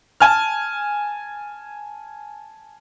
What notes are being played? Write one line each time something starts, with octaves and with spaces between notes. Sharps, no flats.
G#5 A5 F6